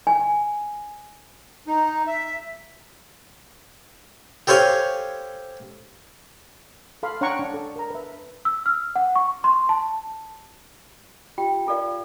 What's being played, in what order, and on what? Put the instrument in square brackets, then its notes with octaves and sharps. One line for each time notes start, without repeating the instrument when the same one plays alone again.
[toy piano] G#5
[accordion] D#4
E5
[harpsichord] G4 A4 C5 C#5 F5 G#5
[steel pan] A4 F5 B5 C6
D4 C#5 F#5 G5 A#5 C#6
D4
A4
A#4 A#5
B4 E5
[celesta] E6
F6
F#5
C#6
C6
A5
[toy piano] F4 G4 G5
F4 A4 A#4 D5 F5